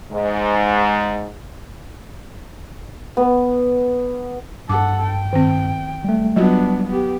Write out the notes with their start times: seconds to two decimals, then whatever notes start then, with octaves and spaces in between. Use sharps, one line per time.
0.12 G#2 G#3
3.17 B3
4.69 G2 A4 F#5 D6
5.04 G5
5.33 D#3 C4
6.04 G3 A3
6.36 F#3 G3 B3 D4 F4 F#4
6.87 B3 G4